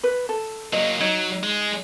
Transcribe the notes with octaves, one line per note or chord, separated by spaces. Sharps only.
B4
A4
F#3 A#3 D#5
F#3 D#4 C#5 D#5
G#3